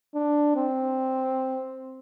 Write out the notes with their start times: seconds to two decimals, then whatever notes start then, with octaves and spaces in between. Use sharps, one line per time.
0.15 D4
0.56 C4